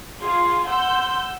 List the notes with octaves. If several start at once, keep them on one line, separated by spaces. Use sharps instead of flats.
F4 G#4 F5 C6
F#5 E6 G6